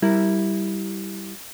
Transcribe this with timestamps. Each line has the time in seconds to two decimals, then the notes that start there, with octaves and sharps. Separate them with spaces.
0.02 G3 E4 A#4